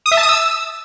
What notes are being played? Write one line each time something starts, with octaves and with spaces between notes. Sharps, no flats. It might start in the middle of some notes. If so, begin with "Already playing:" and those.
D#6
E5
A5
D#6
E6